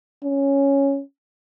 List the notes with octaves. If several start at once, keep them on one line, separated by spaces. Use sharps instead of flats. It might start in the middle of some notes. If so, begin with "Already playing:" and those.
C#4